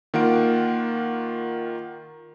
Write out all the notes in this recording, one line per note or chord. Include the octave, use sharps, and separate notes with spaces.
D#3 A#3 F4 A#4 F#5 D7